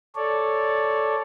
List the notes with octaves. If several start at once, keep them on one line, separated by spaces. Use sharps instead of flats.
A4 C#5 D5